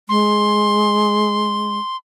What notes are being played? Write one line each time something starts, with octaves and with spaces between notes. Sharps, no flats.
G#3 C6